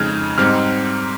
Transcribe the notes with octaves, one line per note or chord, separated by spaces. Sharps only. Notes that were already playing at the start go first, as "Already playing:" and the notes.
Already playing: F2 C#3 G#3 D#4 F6 G#6
G#2 G3 C4 D#4 F6